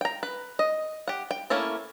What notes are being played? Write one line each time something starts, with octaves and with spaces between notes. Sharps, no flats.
G5 A#5
B4
D#5
G4 F#5
G5
A3 A#3 C#4 E4 A4